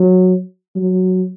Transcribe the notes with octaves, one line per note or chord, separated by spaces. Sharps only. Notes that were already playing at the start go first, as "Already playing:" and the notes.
Already playing: F#3
F#3